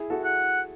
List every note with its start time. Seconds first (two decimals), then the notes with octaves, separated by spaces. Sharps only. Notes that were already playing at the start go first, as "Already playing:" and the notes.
Already playing: E4 G#4
0.10 F#4 A4
0.24 F#5